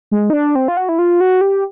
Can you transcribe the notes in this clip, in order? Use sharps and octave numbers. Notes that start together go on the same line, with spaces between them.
G#3
D#4
D4
C4
F4
F#4
E4
F4
F#4
G4